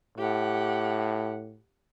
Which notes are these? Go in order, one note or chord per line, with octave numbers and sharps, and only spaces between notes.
A2 G4 F#5